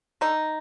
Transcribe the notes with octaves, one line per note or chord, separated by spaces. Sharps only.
D3 D#4